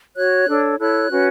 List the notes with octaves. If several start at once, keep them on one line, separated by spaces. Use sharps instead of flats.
F#4 C#5 F#6
D4 A4 C#5
E4 A4 C#5 F#6
C#4 F#4 B4